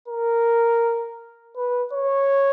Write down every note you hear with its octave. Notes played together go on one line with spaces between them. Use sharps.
A#4
B4
C#5